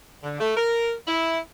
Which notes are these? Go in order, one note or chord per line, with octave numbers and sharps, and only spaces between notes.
D3
A3
A#4
E4